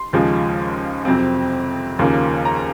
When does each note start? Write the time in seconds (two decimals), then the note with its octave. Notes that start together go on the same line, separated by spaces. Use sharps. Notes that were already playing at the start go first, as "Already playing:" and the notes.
Already playing: C6
0.13 D#2 C#3 F3 G#3
1.05 F2 C3 F#3 C4
1.99 D#2 C#3 F3 A#3 C#4
2.45 A#5